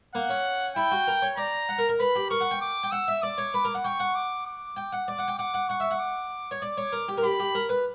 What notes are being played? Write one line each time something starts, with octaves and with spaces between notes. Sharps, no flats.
A#3 F#5
C#4
E4 G5
F#4
A#4
C#5
D5 A#5
F#5
A#4
A#4
B4 B5
G4
A#4 C#6
F#5
G5
D6
G5
F#5 E6
E5
D5 D6
C#5
B4
A#4
F#5
G5 C#6
F#5
D6
D6
G5
F#5
D5 D6
F#5
G5
F#5 D6
F#5
F#5 C#6
E5
F#5
D6
C#5
D5 D6
C#5
A#4
G4
A#4
G4 B5
G4
A#4
B4